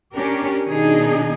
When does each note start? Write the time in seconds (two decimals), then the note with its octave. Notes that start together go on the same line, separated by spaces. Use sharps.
0.14 C#4 D4 G4 A#4
0.68 B2 D#3 D4 D#4 G#4